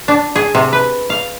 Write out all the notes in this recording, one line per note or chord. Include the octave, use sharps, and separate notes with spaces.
D4
G#4
C3
B4
F5